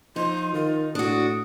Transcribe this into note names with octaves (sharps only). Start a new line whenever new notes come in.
F3 D#4 C6
D#3 F4
A2 D4 F#4 D#6